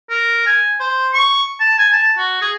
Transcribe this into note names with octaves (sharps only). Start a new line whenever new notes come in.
A#4
G#5
C5
C#6
A5
G#5
A5
F#4
G#4